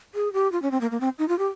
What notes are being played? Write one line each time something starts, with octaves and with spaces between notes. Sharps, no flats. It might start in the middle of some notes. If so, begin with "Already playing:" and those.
G#4
G4
F4
C#4
C4
A#3
A#3
C4
D#4
F4
G4